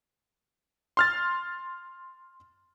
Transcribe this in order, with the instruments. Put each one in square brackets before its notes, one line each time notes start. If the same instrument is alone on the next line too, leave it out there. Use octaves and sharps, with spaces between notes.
[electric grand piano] C6 F6 A6